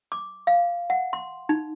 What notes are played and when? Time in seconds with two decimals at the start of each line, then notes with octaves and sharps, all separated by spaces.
0.12 D6
0.47 F5
0.90 F#5
1.13 C6
1.49 D#4